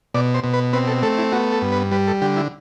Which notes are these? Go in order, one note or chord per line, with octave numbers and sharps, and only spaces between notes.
B2 D5
C5
B2
B4
C4 B4
A4
A3 A4
E4
B3 F#4
A4
G2
B4
G3 B4
A4
D3 G4
E4